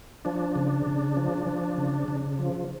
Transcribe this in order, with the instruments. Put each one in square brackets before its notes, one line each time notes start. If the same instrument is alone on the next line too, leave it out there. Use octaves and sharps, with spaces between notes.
[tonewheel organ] F3 D4
C#3
C#3
F3
F3
C#3
C#3
F3